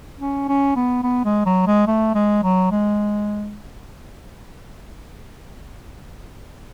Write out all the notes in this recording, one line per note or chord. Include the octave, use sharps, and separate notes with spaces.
C#4
C#4
B3
B3
G#3
F#3
G#3
A3
G#3
F#3
G#3